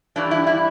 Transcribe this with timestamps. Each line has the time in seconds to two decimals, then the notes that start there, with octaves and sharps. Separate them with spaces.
0.16 G2 E3 G3 D4
0.31 E4
0.47 E4